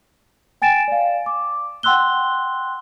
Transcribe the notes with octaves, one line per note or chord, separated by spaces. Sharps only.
G5 G#5 A6 D7 E7
D5 F5
D6
F#5 G5 C6 E6 F#6 G7